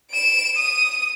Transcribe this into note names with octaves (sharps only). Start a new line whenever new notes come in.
D7 E7
D#6 D#7